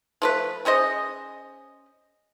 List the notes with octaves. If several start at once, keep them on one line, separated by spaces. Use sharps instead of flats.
F3 A3 B4
C#4 G#4 C5 D#5